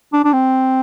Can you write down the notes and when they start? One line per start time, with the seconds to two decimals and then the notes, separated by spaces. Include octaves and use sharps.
0.13 D4
0.24 D4
0.33 C4